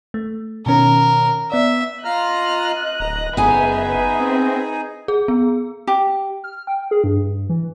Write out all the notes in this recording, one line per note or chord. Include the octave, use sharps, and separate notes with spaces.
A3
B2 D#3 C#4 A#4
B3 D5 E5
F4 D#5 A#5 F6 F#6
D1 A#5
F#1 B3 D#4 G#4 B4 E5 G#5
C4
G#4
B3
G4
F6
G5
G#4
G2
E3